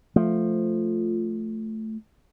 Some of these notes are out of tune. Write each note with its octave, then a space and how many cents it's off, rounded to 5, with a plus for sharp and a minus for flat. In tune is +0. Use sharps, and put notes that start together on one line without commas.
F3 +0 A3 +0